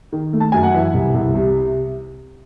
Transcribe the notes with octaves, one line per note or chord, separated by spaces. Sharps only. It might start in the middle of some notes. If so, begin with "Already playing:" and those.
D#3
A3
A5
F#2 G#5
F#5
E3 E5
C2
C2
C3